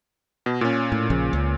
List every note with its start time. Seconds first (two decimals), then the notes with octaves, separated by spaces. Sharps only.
0.46 B2
0.61 A#2 C#4
0.92 A2
1.10 A#1 C#3 F3
1.33 C#2